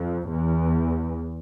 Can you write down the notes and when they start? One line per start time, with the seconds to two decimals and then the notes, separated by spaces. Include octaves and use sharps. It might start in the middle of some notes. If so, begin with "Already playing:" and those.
Already playing: F2
0.31 E2